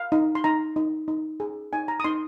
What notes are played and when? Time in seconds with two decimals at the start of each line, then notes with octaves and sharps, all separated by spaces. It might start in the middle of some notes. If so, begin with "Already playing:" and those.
Already playing: F5
0.12 D#4
0.35 C6
0.44 D#4 A#5
0.76 D#4
1.08 D#4
1.40 G#4
1.73 D#4 G#5
1.88 A#5
2.00 D#6
2.04 D#4 C6